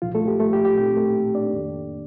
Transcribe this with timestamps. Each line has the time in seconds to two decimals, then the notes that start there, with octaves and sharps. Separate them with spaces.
0.02 C2 A#2 F3 F4
0.15 A3 A4
0.27 G4
0.40 A3 A4
0.53 G4
0.65 G4
0.77 A#2 A3 C4 D#4 G4
0.96 A3 A4
1.35 D4 D5
1.53 F2 D#3 A#3